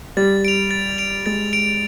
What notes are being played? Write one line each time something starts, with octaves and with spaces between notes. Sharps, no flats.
G3 A6
D7 F7
A6
D7 F7
G#3 A6
D7 F7